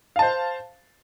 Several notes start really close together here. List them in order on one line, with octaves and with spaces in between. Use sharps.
F5 A5 C5